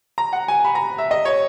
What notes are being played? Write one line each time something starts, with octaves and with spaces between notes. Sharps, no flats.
A#5
F#5
G#5
B5
A#5
E5
D#5
C#5